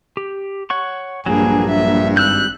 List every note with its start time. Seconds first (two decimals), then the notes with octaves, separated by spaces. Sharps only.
0.17 G4
0.70 C#5 F#5 C#6
1.26 A#1 G2 F#3 A#3 G#4
1.70 E5
2.17 G#1 G3 E6 F#6 G6